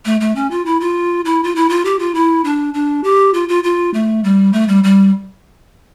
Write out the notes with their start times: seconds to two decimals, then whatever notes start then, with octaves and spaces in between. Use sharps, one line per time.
0.05 A3
0.21 A3
0.35 C#4
0.51 F4
0.66 E4
0.80 F4
1.25 E4
1.43 F4
1.55 E4
1.69 F4
1.85 G4
1.99 F4
2.15 E4
2.44 D4
2.74 D4
3.04 G4
3.34 F4
3.49 F4
3.64 F4
3.94 A3
4.24 G3
4.53 A3
4.68 G3
4.84 G3